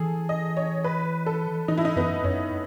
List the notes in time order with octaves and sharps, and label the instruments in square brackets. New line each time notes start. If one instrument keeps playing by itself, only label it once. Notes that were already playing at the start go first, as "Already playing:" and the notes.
Already playing: [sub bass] E3 [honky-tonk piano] G#4 A4
[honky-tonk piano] D#5
C#5
B4
A4
[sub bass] E3 [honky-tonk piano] D#4
[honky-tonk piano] E4
D#4
[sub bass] F#2 [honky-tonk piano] B3
[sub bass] F#2 [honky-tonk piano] C#4